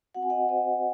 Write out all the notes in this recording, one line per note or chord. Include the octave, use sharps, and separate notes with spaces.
C4 F#4 F#5
G#5
D#5 F#5
C5 D#5